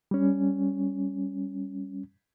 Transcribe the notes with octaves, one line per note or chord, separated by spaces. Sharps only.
G3 C#4